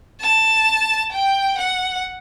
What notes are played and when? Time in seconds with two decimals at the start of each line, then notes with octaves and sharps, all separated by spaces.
0.21 A5
1.12 G5
1.58 F#5